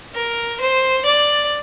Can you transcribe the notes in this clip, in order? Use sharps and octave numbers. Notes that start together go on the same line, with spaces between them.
A#4
C5
D5